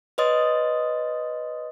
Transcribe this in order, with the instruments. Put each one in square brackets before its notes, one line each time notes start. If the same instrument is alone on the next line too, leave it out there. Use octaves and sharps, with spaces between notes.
[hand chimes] B4 C#5 D#5 C6 D#6 A6